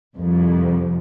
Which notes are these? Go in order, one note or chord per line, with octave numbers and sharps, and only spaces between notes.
C2 F2